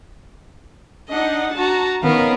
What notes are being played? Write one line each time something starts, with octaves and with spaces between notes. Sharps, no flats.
D4 D#4 D#5 F#5
F#4 A5 A#5
D#3 B3 C#4 A#4 F5